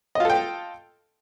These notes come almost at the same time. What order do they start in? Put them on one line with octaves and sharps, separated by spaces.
D#5 F4 A4 G5